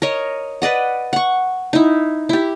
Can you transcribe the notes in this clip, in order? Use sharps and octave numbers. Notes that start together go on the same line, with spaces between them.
A#4 C#5 D#5
B4 D5 D#5 F#5
F#5 C#6
D#4 E4
E4 G4